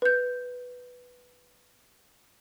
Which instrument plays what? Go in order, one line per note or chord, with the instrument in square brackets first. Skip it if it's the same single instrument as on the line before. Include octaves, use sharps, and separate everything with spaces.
[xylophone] B4 G6